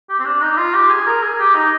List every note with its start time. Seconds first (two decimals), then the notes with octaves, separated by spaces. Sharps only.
0.10 G4
0.19 C4
0.25 D4
0.42 D#4
0.58 F4
0.74 G4
0.90 G#4
1.07 A#4
1.23 G#4
1.40 G4
1.55 D#4